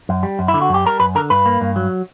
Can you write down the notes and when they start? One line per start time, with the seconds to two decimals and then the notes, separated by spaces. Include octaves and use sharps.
0.09 F#2
0.23 G3
0.39 F#2
0.48 E4
0.54 D3
0.61 F#4
0.69 F#2 G4
0.85 G3 A#4
1.00 F#2 B4
1.15 D3 A#4
1.30 G2 B4
1.46 A#3
1.61 G2
1.76 F#3